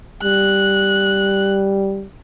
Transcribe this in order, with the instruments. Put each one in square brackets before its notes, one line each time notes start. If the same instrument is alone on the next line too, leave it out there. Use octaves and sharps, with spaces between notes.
[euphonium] G3 [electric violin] F#6